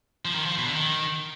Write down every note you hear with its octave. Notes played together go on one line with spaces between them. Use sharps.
F3
D#3
F3
B2
D3
D#3